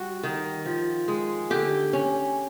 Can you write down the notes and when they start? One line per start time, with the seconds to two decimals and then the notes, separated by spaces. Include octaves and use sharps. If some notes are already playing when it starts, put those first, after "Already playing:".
Already playing: G3 F#4
0.23 D#3
0.65 F3
1.08 G#3
1.50 D3 G4
1.93 C#4